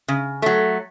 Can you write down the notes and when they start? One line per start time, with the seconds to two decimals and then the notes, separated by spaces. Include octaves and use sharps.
0.08 C#3
0.42 F#3 A3